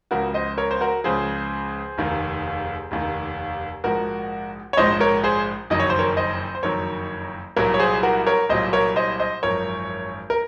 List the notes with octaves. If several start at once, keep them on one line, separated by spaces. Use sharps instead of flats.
C#2 C#3 F3 F#4 A#4
C5 D#5
A#4 C#5
C5
F#4 A#4
C#2 C#3 F3 G#4 C5
F1 D#2 D#3
F1 D#2 D#3
A#1 G#2 F3 F#4 A#4
C#5
A#1 G#2 F3 C5 D#5
A#4 C#5
G#4 C5
F#1 F2 D#3 F#3 D#5
C#5
C5
A#4 C#5
C5 D#5
C5
F#1 F2 D#3 F#3 A#4 C#5
C2 A#2 F#3 A#4 C#5
C#5
G#4 C5
F#4 A#4
A#4 C#5
C2 A#2 F#3 C5 D#5
A#4 C#5
C5 D#5
C5 D#5
G#1 F#2 F3 A#4 C#5
A#4